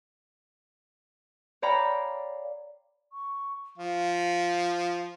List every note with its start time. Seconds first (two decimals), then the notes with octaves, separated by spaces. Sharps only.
1.62 C#5 D5 F5 G5 A#5 B5
3.13 C#6
3.78 F3 F5